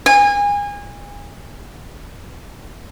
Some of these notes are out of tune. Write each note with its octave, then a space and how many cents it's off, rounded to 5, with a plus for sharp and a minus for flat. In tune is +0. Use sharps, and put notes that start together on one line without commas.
G#5 -30